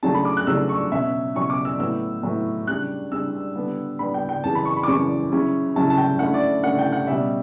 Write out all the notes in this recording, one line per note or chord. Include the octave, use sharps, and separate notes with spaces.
C#3 F#3 A3 D4 A5
B5
D6
F#6
C#3 F#3 A3 D4 E6
C#6
B2 F#3 C#4 E5
B2 F#3 C#4 C#6
D6
E6
A2 F#3 B3 E4 E6
A2 F#3 B3 E4
C#3 G3 D4 F#6
C#3 G3 D4 E6
D3 G3 B3 D4
D3 G3 B3 D4 B5
G5
G5
F#2 C#3 E3 A5
B5
C#6
B5
D6
F#2 C#3 E3 C#6
C#3 F#3 C#4 E4
C#3 F#3 C#4 E4 A5
A5
G5
D3 A3 C#4 E4 F#5
D5
D3 A3 C#4 E4 F#5
G5
F#5
B2 G3 C#4 E5